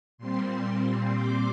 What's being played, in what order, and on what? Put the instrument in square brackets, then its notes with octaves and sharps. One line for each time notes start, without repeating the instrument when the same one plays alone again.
[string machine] A#2 G3 C4 C6
D6